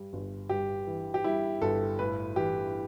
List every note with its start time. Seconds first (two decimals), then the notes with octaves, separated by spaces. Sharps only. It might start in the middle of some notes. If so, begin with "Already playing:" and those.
Already playing: G2 G3
0.13 G1
0.49 G2 G4
0.87 E3
1.14 G4
1.24 G3 E4
1.62 G1 A4
1.99 A2 B4
2.36 E3 G4